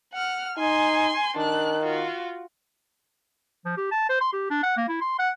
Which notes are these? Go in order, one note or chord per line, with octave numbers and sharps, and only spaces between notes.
F#5 F6
D#4 G#5 C6
D#3 D4 F#6
F4 F#4
F3
G4
A5
C5
C6
G4
D4
F#5
A#3
E4
C6
F#5